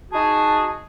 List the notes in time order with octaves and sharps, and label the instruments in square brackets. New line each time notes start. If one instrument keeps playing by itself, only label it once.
[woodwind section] D#4 F#4 G#4 A5